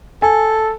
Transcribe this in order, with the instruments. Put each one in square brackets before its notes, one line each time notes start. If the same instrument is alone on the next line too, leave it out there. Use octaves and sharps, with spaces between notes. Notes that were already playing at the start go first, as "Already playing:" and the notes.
[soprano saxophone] A4 [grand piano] G#5